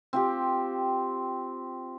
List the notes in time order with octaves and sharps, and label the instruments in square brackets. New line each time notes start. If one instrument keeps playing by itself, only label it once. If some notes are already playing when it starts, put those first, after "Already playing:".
[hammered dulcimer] C4 F4 G4